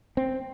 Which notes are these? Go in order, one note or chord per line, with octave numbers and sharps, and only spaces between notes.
C4